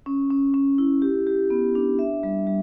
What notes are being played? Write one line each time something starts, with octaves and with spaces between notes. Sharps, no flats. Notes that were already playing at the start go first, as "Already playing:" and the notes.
C#4
C#4
C#4
E4
G4
G4
B3
D4
E5
G3
G3